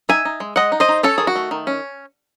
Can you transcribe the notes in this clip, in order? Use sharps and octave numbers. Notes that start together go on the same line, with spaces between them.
D#4 E5 G#5
D#4
G#3
G#3 D#5 F#5
D#4
C5 D#5
D#4
C#4 A4 C#5
D#3 G#4
F#4
A3
D#3
C#4